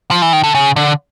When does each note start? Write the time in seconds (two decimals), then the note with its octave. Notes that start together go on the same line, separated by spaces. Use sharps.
0.11 F3
0.22 E3
0.33 D#3
0.44 D3
0.55 C#3
0.76 D3